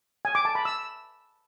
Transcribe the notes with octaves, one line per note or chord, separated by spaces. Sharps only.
G#5
D6
A5
B5
E6